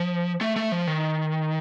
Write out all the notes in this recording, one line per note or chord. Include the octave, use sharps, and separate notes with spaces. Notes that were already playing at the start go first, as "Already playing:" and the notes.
Already playing: F3
A3
A3
F3
D#3